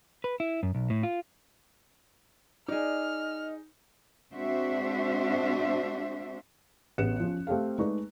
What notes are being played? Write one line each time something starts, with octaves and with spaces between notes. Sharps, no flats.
B4
E4
F#2
B1
A2
F4
D#4 G#4 D5 D#5 F6
G#3 C4 D4 F#4 C5 E5
A1 B3 F#6 C#7 E7
F3 C#4
A3 C4 G4 A4 F5
G#3 A3 D#4 B4 D5 C#6